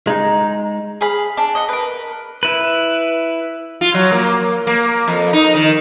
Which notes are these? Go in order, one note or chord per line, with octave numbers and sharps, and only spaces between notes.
G#3 D#4 A#5
G#4 F5 B5
D4
D#5 F#5
A#4 B4
E4 B4
F4
F#3
A#3
A#3
F2
D#4
D#3